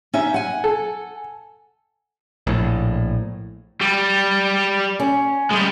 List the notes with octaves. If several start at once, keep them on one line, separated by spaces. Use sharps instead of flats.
C#4 D#4 E5
F#5 G#5
A4
A#1 A2
G3
C#4
G3 G#3